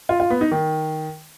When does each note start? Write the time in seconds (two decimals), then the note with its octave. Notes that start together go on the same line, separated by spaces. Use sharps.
0.09 F4
0.20 F4
0.30 B3
0.41 D#4
0.52 D#3